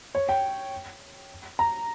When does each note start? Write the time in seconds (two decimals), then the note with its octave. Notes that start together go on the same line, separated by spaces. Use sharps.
0.15 C#5
0.29 G5
1.59 A#5